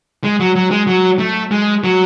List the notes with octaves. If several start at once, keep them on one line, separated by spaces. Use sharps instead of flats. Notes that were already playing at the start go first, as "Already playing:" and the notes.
G#3
F#3
F#3
G#3
F#3
A3
G#3
F#3